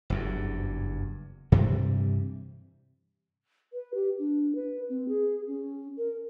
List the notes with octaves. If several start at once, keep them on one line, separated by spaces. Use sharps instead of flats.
F#1 E2 G2
G2 C3 E3 G3
B4
G4
D4
B4
C4
G#4
C#4
A#4